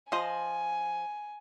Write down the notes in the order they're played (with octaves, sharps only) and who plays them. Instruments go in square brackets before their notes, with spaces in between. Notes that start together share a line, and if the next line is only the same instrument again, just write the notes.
[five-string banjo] F3 C5 D#5 [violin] G#5